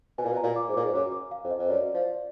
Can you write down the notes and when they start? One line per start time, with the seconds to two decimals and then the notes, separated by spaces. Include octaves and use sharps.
0.18 B2 G#5
0.25 A#2
0.32 B2
0.37 A#5
0.43 A#2
0.56 D6
0.68 G#2
0.74 A#2 D6
0.84 G#2
0.94 F#2 D6
1.12 D6
1.31 F5
1.44 F2
1.51 D#5
1.58 F2
1.69 F#2 D5
1.94 F3